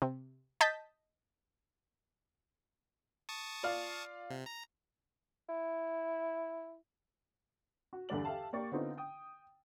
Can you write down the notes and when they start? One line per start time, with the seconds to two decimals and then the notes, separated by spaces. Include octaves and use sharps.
0.02 C3
0.61 D#5 A5 G6 A6 B6
3.29 A5 C#6 D#6
3.63 F4 D5 F5
4.30 C3
4.46 A#5
5.49 E4
7.93 F#4
8.09 E2 G2 D3 G3 D5 F#7
8.25 G4 A4 E5 F5 A5
8.53 A#3 G4 D5 C#6
8.72 D3 B3 C4 D#4 F4
8.97 G5 D#6